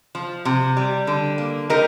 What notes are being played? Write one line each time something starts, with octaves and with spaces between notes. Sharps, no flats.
F3
C3
G3
D3
A#3
D#4 G4 A#4